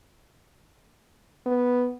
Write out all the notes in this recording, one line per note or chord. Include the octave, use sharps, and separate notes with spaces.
B3